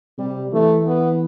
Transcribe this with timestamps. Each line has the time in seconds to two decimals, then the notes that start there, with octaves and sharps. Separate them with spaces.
0.18 C3 G3
0.53 E3 A3
0.86 B3